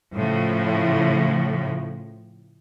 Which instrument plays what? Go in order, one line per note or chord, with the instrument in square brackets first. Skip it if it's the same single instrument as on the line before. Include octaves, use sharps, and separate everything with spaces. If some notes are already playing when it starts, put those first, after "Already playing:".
[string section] A2 C#3 F3